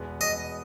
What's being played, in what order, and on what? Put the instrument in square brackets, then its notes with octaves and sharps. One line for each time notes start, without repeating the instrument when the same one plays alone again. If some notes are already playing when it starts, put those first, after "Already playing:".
Already playing: [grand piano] E2 B2 G#3 B3
[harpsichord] D#5